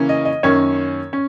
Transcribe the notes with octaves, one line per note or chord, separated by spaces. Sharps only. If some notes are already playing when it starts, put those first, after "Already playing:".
Already playing: C#3 E3 A#3 C#4
D#5
D#5
F#2 D#3 A#3 C#4 C#5
C#4